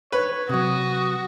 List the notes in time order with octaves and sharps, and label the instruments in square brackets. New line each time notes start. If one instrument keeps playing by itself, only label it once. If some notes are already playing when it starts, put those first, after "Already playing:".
[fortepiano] B4 [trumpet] C#5
[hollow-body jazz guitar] C3 F#3 [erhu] F#4 [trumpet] D#6